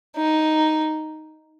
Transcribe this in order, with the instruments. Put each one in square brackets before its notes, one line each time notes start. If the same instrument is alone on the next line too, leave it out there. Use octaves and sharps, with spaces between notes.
[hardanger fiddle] D#4